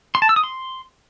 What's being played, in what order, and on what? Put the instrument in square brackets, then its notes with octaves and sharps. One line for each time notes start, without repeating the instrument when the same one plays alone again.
[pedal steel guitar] C6
A5
E6
D#6
C6